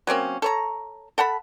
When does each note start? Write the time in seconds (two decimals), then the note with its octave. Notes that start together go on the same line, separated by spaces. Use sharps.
0.07 F#3 A#3 C4 C#4
0.42 A4 C#5 A#5
1.18 A4 F#5 A5 B5